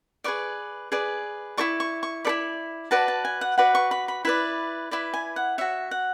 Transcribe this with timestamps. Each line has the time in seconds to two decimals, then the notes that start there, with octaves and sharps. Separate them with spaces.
0.24 G#4 B4 D5 C#6
0.92 G#4 B4 D5
1.57 E4 A4 D5 C#6
1.80 C#6
2.03 C#6
2.25 E4 A4 D5 B5
2.91 F#4 B4 D5 A5
3.08 A5
3.25 G#5
3.41 F#5
3.58 F#4 B4 D5 F#5
3.75 C#6
3.91 B5
4.08 B5
4.25 E4 B4 D5 B5
4.91 E4 B4 D5
5.14 G#5
5.36 F#5
5.58 F#4 C#5 E5
5.91 F#5